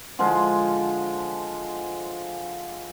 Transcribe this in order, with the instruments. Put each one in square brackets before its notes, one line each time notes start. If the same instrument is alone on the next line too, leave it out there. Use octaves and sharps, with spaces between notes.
[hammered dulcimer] D3 F3 G#3 F4